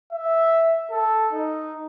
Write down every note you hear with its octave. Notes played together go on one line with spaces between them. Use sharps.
E5
A4
D#4